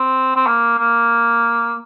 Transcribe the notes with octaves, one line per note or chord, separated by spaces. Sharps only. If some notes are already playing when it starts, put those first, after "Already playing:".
Already playing: C4
C4
A#3
A#3